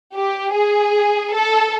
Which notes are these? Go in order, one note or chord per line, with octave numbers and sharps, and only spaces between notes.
G4
G#4
A4